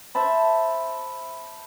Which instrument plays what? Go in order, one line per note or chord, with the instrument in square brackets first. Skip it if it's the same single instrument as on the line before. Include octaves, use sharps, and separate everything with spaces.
[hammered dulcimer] C5 E5 A5 B5